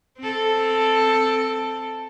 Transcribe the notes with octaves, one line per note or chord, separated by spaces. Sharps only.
C4 A4